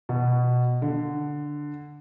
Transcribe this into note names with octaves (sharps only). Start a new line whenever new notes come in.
B2
D3